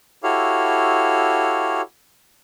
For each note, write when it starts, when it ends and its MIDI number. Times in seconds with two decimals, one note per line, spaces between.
0.23 1.81 64
0.23 1.81 66
0.23 1.81 67
0.23 1.81 69
0.23 1.81 73
0.23 1.81 77